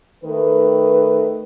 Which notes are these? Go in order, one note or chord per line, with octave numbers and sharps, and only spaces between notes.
D#3 A3 B4